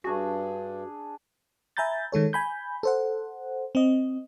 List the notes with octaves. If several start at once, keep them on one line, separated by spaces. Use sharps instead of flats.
G2 D4 F#4 G#4
E5 G#5 A#5 B5 G6 A6
D#3 G#3 A4 C#5
G#5 B5 G6
A4 C5 F#5
C4 D#5